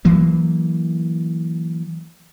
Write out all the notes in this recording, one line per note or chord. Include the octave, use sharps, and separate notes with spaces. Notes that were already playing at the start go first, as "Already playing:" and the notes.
E3 F#3 A#3